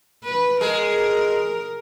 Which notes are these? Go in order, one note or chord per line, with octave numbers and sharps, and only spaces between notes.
B4
G#3 A#4